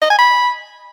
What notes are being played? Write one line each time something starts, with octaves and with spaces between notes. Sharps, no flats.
D#5
G#5
B5